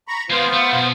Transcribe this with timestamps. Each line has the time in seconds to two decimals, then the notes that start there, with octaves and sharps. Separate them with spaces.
0.08 A#5 B5 C#6
0.30 G#3 B3 C4 F4 C5
0.53 A3
0.73 B1